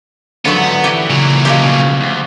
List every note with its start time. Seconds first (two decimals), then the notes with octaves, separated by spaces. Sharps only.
0.45 G#2 D3 F3 F#3 B3
0.84 E3 G4
1.10 A#2 C#3 F#3
1.45 B2 F3 G#3 C#4 G4
2.00 D2